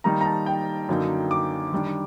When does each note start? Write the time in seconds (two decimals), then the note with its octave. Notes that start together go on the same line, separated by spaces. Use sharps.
0.04 D#3 G3 A#3 D#4 A#5
0.21 A#5
0.25 A5
0.46 G5
0.89 F#2 D3 F#3 A#3 D#4
1.31 D6
1.72 D#3 G3 D4